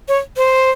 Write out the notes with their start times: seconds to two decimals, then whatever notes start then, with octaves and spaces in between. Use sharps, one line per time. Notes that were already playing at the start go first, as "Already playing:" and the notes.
0.08 C#5
0.37 C5